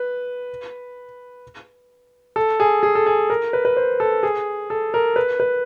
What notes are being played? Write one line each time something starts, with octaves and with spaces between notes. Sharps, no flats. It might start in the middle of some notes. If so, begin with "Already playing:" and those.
Already playing: B4
A4
G#4
G#4
A4
G#4
A#4
B4
B4
C5
A4
G#4
A4
A#4
B4
B4